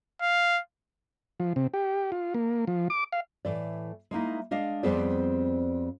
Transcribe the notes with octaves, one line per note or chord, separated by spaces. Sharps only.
F5
F3
C3
G4
F4
A#3
F3
D6
F5
A2 E3 D5
G#3 A#3 D#4 E4
G#3 D4 D#5 F5
F2 G3 B3 C4 G#4 D5